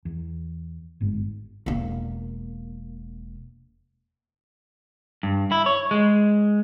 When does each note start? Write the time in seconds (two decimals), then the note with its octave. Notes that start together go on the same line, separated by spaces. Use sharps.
0.05 E2
1.01 G1 G#2
1.66 E1 A#3
5.23 G2
5.52 E4
5.66 C#5
5.91 G#3